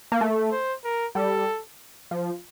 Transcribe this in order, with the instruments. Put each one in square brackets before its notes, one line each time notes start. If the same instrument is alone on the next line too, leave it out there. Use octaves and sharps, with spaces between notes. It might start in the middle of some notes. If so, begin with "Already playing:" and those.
[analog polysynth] A#3
A3
[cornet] C5
A#4
[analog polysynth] G3 [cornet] A4
[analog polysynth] F3